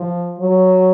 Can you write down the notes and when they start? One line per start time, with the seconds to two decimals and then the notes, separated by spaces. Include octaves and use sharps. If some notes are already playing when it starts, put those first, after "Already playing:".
Already playing: F3
0.39 F#3